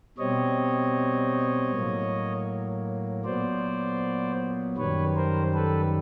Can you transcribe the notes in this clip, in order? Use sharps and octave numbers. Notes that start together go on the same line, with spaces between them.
B2 G3 C4 C#5 D#5
A2 F#3 A#3
A#2 F#3 B3 C5 D5
F#2 D#3 G3 B4 C#5
A#4 C5
A4 B4